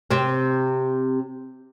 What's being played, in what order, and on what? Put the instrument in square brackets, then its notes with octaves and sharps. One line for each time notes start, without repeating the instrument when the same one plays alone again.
[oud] C3 C4